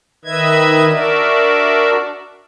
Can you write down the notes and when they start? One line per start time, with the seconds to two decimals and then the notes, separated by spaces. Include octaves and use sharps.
0.25 D#3 B4 D#5 E5 G#6
0.89 D4 F#4 A#4 D5 E5